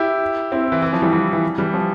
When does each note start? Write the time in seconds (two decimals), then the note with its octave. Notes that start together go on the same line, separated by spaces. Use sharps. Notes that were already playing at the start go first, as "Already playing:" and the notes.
Already playing: E4 G4
0.52 C4 E4
0.72 E3
0.82 E3
0.93 F3
1.02 E3 G3
1.12 E3
1.33 E3
1.58 E3 G3
1.74 F3